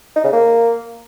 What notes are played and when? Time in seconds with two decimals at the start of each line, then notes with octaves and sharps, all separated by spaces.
0.16 D#4
0.24 C#3
0.33 A#3